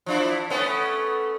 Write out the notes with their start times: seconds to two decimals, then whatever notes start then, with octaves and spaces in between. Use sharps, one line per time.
0.06 F3 D4 E4
0.50 A3 B3 C#4